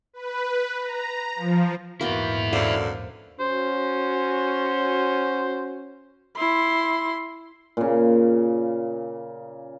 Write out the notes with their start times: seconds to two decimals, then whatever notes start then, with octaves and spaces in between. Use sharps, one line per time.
0.13 B4
0.81 A#5
1.35 F3
2.01 A#1 E2 G#2 A#3 B3 E4 F#4 G5
2.53 F#2 D3 C5 D5 F5
3.40 C#4 F#4 C5
6.36 E4 C6
7.77 A#2 C#3